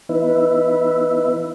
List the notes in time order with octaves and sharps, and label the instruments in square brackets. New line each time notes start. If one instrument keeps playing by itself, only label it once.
[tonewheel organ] E3 B3 D#4 B4 E5